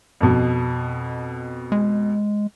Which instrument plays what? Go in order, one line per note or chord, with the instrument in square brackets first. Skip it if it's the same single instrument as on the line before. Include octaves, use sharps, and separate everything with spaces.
[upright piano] F2 B2
[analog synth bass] G#3